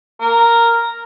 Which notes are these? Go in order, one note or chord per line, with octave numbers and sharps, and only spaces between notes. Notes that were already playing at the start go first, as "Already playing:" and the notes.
A#4